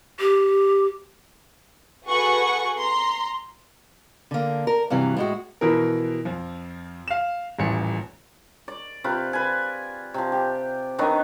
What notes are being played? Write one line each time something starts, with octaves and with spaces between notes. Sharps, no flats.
G4
F#4 G#4 A4 B4 F#5 C#6
A#5 C6
D3 A#3
A#4
G2 C3 E3 F#3
A2 G#3 F#4
B2 E3 F3 A#4
F2 F3
F5 E7
D#1 A1 C#7
D5
C3 F4 B4
B4 G#5
C3 F3
G4
D#3 F#3 B3 D4